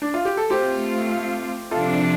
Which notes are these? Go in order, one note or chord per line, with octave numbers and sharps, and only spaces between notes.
D4
F4
G4
A4
A3 C4 F4 G4 C5
C3 F3 D4 F4 A4